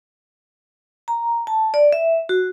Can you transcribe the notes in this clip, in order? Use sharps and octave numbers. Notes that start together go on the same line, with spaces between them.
A#5
A5
D5
E5
F#4